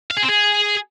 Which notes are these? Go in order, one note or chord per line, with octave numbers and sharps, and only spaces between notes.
F5
G#4
C4
G#4